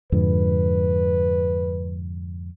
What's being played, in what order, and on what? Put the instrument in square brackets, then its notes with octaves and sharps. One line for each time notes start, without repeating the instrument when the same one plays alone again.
[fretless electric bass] F2 G#2 D3 [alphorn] B4